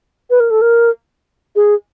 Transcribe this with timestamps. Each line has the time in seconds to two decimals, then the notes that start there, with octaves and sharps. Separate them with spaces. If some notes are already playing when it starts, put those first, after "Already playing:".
0.30 B4
0.40 A#4
0.50 A4
0.62 A#4
1.56 G#4